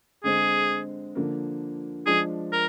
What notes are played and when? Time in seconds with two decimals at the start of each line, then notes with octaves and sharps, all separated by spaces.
0.24 D3 G#3 C4 G#4
1.15 D3 F3 A#3
2.06 F3 G#3 D4 G#4
2.53 A#4